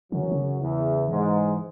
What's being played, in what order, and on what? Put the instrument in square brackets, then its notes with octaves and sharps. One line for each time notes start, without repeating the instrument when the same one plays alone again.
[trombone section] F#2 F#3 [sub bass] C#3
[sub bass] E3
C#3
[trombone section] E2 E3
[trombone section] G#2 G#3 [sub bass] E3